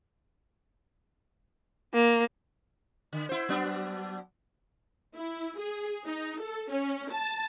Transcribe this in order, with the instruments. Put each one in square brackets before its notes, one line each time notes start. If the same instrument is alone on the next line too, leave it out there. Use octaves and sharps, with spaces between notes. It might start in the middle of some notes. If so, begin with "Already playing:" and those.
[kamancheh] A#3
[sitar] D3
E4 C5
F#3 B3 D4
[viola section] E4
G#4
D#4
A4
C#4
A5